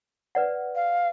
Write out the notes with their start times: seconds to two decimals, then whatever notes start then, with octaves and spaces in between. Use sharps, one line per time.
0.35 B4 D5 F#5
0.75 F5